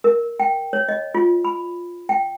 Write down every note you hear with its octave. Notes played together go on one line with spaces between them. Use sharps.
A#4
G5
C#5
D#5
F4
B5
G5